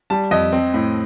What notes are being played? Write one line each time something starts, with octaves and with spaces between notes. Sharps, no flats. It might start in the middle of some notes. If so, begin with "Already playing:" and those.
G3 A5
F2 D#5
C4
A2